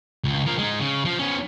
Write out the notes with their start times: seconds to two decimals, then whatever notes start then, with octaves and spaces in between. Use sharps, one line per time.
0.24 C#2
0.46 F3 A#4
0.59 G#3 D#4
0.79 C#3
1.05 F3
1.19 B3 C#4